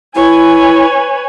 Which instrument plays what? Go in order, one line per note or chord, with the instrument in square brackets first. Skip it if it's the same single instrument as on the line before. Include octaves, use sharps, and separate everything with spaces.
[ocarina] E4 [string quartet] B4 C#5 G#5